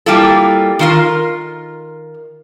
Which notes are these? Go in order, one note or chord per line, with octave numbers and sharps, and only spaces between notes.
G3 A#3 E4 F4 A4
D#3 F4 A#4